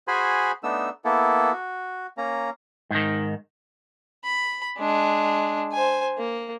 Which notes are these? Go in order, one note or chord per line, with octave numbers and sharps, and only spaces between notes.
F#4 G#4 C5 G#5 B5
A3 B3 D4 D#4 E6
A#3 B3 E4 A4
F#4
A#3 C#4 A#5
G#2 D#3
B5
G#3 D4
C5 G#5
A#3